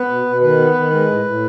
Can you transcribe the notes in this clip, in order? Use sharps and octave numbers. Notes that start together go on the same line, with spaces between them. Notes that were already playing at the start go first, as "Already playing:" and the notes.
Already playing: B3 B4
B2
B2
D#3 B4
B3
D#3
G#3
A2
A2